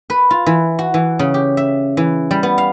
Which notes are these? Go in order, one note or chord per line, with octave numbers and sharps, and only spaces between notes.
B4
F4
E3
F#4
E3
C#3
G4
E5
E3
G3
B3
F5